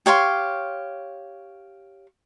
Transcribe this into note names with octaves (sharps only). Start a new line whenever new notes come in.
G4 C#5 F5 C6